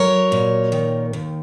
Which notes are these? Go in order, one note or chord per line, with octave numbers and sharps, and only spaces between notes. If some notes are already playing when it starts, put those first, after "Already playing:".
Already playing: F#3 A#4 C#5
A#2
D#3
D#2